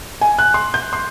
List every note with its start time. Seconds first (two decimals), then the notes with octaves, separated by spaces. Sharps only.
0.21 G#5
0.39 F#6
0.54 C6
0.74 G6
0.93 C6